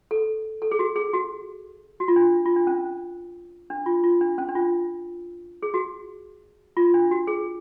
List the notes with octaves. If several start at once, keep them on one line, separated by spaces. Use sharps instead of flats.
A4
A4
G#4
F#4
G#4
F#4
F#4
F4
D4
F4
D4
C#4
D4
F4
F4
D4
C#4
D4
F4
G#4
F#4
F4
D4
F#4
G#4